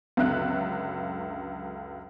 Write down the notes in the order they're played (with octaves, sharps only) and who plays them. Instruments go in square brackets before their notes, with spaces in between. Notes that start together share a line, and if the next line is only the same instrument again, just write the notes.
[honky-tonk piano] C#2 F#2 D3 E5 F5 F#6